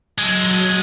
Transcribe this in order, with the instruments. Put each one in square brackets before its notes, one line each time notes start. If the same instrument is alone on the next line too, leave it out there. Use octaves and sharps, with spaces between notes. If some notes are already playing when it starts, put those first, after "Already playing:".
[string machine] F#3 [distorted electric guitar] G#3 A4